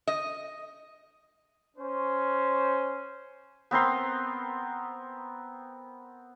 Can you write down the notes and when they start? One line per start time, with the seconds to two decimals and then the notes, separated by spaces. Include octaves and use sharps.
0.07 D#5
1.77 C#4 C5
3.71 B3 C4 A#4 C6